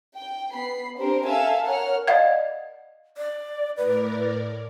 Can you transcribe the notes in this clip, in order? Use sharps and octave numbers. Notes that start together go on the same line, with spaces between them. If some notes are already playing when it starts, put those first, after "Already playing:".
G5
B3 B5 C7
C4 D4 G4 A#4 C5
A4 E5 F5 G#5 A5 E6
A#4 C#5 F#5 F6
D5 D#5 F5 F#5 G#6
D5
A2 A#4 B4 D5